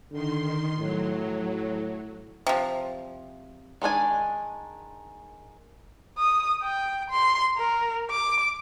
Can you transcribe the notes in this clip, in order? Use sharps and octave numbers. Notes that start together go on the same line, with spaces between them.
D3 D#3 C6
A2 F#3
C3 F3
D#3 G#3 D4 G#5
D#6
G5
C6
A#4
D6